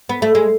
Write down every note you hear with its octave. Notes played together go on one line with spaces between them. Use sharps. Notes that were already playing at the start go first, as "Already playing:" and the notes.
B3
A3
G#3